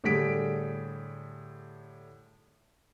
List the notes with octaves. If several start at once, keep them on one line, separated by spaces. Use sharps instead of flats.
A2 D3 G3 G#4 B6 D7